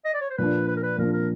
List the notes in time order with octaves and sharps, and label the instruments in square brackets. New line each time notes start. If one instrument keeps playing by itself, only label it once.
[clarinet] D#5
D5
C#5
C5
[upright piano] A#2 F3 A#3 D4 [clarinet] B4
[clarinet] B4
A#4
B4
[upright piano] A#2 F3 A#3 D4 [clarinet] A#4
[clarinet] A#4